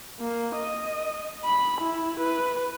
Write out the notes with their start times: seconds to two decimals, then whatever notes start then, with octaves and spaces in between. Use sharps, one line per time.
0.20 A#3
0.56 D#5
1.45 B5
1.81 E4
2.20 B4